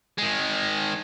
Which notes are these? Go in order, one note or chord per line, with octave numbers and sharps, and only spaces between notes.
D#3 G#3